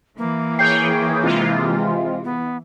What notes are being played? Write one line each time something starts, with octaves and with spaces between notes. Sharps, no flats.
E3 A#3
G#4 C#5 G5 G6 C7
C3 G#3 F4
B3